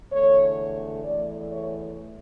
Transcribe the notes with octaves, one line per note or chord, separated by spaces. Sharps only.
E2 D3 A3 C#5
E2 E3 A3 D5
C#5